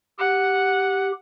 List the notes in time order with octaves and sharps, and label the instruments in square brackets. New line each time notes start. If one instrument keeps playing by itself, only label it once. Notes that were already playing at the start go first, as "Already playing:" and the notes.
[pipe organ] G4 [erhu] F#5